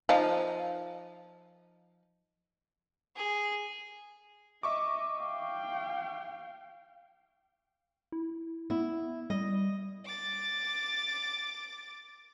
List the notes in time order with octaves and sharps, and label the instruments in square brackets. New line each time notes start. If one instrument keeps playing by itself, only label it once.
[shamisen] F3 D#4
[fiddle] G#4
[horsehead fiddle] D#5 [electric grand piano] E5 C#6 D6
[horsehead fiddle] F5 G5
[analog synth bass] E4
[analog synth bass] B3 [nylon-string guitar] E4
[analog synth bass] G3 [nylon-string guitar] D#5
[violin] D6 A6